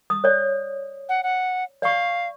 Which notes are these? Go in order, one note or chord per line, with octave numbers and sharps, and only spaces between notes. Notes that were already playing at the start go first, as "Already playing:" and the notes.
D#6
C#5 D5
F#5
F#5
D5 F5 C#6